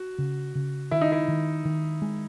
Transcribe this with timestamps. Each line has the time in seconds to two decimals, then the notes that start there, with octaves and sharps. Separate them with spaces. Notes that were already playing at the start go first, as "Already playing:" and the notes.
Already playing: F#4
0.18 C#3
0.55 C#3
0.91 D#3 E4
1.01 D#4
1.12 E4
1.28 D#3
1.65 D#3
2.02 G#3